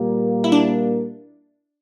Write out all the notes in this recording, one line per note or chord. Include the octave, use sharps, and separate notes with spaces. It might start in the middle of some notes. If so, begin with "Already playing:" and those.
Already playing: A#2 G3 A#3
E4
D4